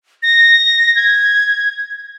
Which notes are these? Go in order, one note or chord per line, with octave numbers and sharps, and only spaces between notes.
A#6
G#6